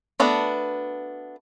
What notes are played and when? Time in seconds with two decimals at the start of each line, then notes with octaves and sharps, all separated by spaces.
0.20 A3 B3 D4 F#4